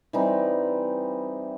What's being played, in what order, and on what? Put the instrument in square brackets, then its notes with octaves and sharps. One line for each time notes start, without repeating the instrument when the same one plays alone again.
[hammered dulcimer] E3 G3 C4 D#4